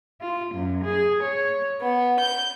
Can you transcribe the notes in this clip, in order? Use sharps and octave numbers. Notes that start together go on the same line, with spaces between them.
F4
F#2
G#4
C#5
B3
G6